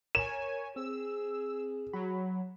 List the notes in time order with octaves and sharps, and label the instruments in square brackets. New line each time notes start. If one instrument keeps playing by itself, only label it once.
[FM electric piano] A#4 [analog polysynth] C#5 G#5 [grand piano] E7
[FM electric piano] C4 [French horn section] G#4 [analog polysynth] E6
[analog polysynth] F#3 [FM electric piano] F#4 B5